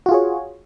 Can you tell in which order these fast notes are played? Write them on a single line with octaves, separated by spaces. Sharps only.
F#4 F4 G#4 C#5